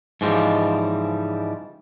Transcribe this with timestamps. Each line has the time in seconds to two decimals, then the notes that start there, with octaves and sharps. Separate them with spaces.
0.21 G#2 C#3 E3 F3 G3 G#3